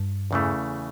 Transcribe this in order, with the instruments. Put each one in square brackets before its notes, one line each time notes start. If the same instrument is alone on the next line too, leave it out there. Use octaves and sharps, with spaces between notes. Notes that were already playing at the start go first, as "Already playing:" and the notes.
Already playing: [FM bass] G2
[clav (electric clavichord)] E2 C#3 E3 A3